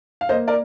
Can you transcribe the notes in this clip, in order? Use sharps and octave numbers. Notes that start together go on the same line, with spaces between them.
F5
A#3 C5 D#5
A#4 D5